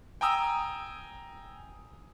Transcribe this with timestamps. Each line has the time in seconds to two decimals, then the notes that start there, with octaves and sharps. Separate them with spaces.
0.21 G5 G#5 A#5 D#6 E6